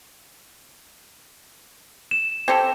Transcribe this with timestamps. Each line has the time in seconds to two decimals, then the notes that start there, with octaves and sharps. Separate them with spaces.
2.11 E7
2.48 C4 G4 A4 G#6